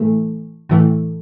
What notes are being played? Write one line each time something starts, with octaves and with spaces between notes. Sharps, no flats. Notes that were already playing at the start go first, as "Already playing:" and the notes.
Already playing: A2 E3 A3
A2 E3 A3